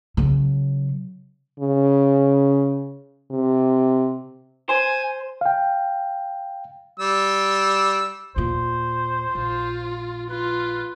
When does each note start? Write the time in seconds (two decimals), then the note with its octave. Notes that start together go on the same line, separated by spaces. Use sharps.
0.17 C#3 F#3
1.60 C#3
3.31 C3
4.69 C5 G#5
5.41 F5 G5
7.00 G3 E6
8.36 D#2 A#2 C5
9.35 A#1 F4
10.30 F4 B4